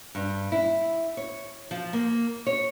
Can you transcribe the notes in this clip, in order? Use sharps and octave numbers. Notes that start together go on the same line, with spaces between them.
G2
E4
C#5
F3
A#3
C#5